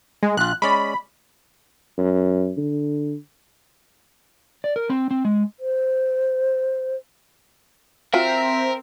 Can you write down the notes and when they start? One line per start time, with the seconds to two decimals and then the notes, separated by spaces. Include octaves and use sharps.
0.23 G#3
0.37 A#1 F4 F#6
0.62 G#3 C#4 D5 B5
1.98 F#2
2.58 D3
4.64 D5
4.76 A#4
4.90 C4
5.11 C4
5.25 G#3
5.60 C5
8.13 C4 F4 F#4 A#4 E5